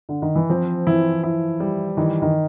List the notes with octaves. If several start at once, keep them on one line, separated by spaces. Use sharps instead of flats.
D3
D#3
E3
F3 C4
E3 E4
E4
G3
D#3 E3
D#3